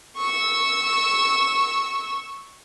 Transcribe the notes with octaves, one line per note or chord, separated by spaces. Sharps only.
C#6 E6